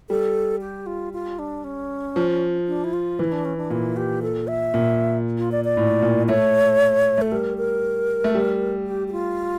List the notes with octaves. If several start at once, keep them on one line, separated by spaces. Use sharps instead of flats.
G3 A4
G4
F4
F4
D4
C#4
F3
D4
E4
F4
E3 E4
D4
C#4
D4
A#2 E4
G4
A4
E5
A#2
F4
D5
D5
A2
A#2
A3 C#5
A3 A4
G3 A#4
A#4
A3
G3
G4
G4
F4